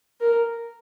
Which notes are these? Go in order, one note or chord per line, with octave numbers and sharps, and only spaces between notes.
A#4